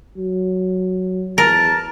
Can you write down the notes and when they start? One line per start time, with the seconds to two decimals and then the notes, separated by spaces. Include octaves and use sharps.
0.18 F#3
1.38 E2 A#4 A5